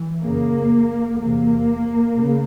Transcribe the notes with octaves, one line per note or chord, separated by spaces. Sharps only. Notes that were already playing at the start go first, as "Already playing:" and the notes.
Already playing: E3
F#2 C#3 A#3
E2 C3 A#3
C#3